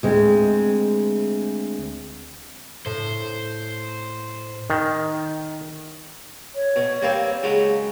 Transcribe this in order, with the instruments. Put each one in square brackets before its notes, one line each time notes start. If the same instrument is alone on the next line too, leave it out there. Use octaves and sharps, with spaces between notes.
[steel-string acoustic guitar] D2 G#3 C4
[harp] A2 [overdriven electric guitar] C5
[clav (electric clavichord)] D#3
[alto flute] C#5
[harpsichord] B2
G3 A#3 C4
C#3 F#3 G#3